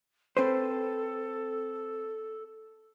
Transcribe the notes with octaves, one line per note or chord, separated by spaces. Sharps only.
C4 A4 B4 C5